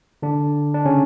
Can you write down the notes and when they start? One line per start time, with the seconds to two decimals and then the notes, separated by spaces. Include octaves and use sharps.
0.22 D3 D4
0.74 D4
0.85 C#3 C#4